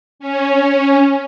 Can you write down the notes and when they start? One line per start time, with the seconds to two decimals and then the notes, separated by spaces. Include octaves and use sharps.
0.19 C#4